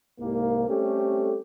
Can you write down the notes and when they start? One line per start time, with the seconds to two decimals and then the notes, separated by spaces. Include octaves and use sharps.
0.20 C2 G#2 A#3
0.68 G3 A3 C4 C#4 G4 A4